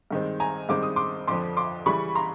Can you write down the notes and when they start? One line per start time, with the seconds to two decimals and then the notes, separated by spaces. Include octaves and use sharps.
0.11 G2 D#3 G#3 C4
0.40 G#5 A#5
0.69 G2 D#3 G#3 C4 D6
0.83 D#6
0.96 C6 D6
1.27 F2 D3 F3 C6 D6
1.57 C6 D6
1.86 C#3 E3 G3 B5 C#6
2.15 A#5 C6